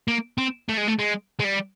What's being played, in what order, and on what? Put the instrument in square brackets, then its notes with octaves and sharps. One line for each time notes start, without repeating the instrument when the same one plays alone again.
[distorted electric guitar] A#3
C4
A3
G#3
A3
G#3
G#3
G3